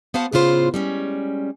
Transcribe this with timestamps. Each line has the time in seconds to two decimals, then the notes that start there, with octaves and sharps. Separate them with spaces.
0.14 B3 F#4 C5 F5 F#5 A5
0.32 A2 C#3 B3 F4 C5
0.74 G3 G#3 C#4